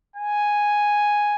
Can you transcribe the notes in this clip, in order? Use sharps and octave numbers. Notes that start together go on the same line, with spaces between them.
G#5